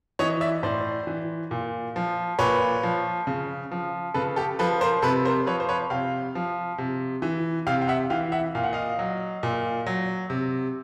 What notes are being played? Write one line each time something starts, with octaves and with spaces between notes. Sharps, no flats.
E3 C#5 D#5
D5 E5
A2 C5 D5
E3
A#2
F3
A#2 B4 C#5
F3
C#3
F3
C#3 A4 B4
G4 A4
F3 A4 B4
A#4 C5
C3 A4 B4
A#4 C5
F3 B4 C#5
C5
B4 C#5
C3 F5 G5
F3
C3
E3
C3 F5 G5
G5
E5 F#5
E3 F5 G5
E5 F#5
A#2 F5
F#5
D#5 F5
F#3
A#2
F#3
C3